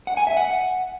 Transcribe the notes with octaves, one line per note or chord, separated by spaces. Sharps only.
F#5
G#5
E5
F#5